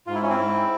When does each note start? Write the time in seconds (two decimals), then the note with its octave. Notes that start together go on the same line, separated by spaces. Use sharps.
0.07 G#2 F4
0.14 E4
0.23 C#4
0.29 C4 E4
0.38 G#2